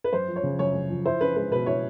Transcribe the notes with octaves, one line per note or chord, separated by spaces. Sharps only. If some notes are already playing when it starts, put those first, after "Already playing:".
B4
F#2 C5
F3
C#5
C#3
F#2 C#5
F#2
F3
E4 C5
C#4 B4
G#3 B4
B2 B4
E4 C#5